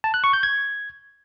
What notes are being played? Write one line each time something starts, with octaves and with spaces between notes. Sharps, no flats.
A5
F#6
C#6
G6
G#6